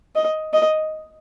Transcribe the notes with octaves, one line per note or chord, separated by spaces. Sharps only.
D#5
D#5